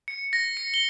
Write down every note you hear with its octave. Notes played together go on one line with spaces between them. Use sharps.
C#7
A#6
C#7
G7